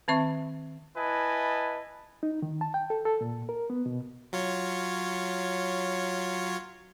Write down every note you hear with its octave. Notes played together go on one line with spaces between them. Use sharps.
D#3 C4 E5 C#6
E4 B4 D#5 G#5 A5
D#4
D#3
A5
G5
A4
A4
A#2
A#4
B3
B2
F#3 F4 C#5